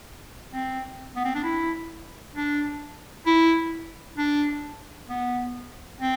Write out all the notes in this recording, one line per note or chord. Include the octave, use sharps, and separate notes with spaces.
C4
B3
C4
D4
E4
D4
E4
D4
B3
C4